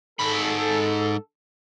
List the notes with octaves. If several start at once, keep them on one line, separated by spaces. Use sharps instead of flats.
G#2 A4 B5